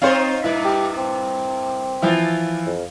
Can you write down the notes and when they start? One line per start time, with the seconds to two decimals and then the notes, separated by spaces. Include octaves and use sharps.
0.02 C4 D#4 F4 C5 C#5 F5
0.44 G2 A#2 E4 B4
0.65 G4
0.98 C4
2.02 E3 F3 E4 F4
2.66 F2